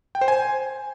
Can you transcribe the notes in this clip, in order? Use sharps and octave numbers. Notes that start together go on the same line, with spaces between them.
G5
C5
G#5